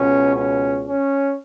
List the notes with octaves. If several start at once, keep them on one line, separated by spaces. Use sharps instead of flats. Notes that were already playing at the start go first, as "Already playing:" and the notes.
Already playing: C#2 B2 C#4
C#4
C#4